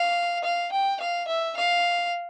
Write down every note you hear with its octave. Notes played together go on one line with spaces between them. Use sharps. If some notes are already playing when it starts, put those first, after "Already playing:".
Already playing: F5
F5
G5
F5
E5
F5